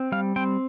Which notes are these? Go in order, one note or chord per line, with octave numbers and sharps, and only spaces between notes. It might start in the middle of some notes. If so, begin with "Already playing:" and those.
Already playing: C4
G3 F5
C4 G5